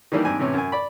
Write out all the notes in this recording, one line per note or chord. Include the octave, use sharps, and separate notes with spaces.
D#3 E3 G3 A#3 D4
G#2 G3 C4 D4 G#5
A2 C3 E3 C#4
F#2 G#5
D5 B5